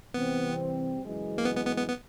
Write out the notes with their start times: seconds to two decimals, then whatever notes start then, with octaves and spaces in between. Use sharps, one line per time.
0.14 C3 E3 G3 B3 C4
1.01 F#2 C#3 E3 G#3
1.38 A#3
1.45 B3
1.56 B3
1.67 B3
1.78 B3
1.88 B3